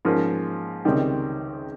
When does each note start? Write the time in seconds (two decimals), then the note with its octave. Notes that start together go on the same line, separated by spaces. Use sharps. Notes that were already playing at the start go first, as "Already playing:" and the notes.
0.05 G#2 F3 A#3 C#4
0.85 C#2 C3 D#3 G3